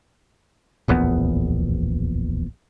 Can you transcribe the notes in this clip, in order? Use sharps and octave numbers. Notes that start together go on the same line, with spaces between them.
D1 A#1 E2 B3